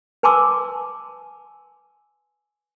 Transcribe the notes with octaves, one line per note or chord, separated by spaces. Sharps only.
B4 G#5 A5 C6 D6 E6